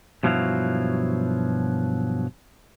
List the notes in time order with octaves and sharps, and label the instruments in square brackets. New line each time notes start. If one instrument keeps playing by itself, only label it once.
[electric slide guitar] G2 B2 F3 F#3 E4 F5